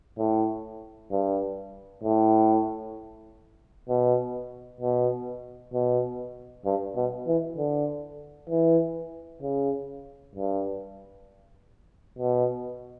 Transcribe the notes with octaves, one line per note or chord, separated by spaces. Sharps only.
A2
G2
A2
B2
B2
B2
G2
B2
E3
D3
E3
C#3
G2
B2